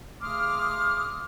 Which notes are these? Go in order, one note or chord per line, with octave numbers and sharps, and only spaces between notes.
C#3 A3 C6 D6 D#6 F6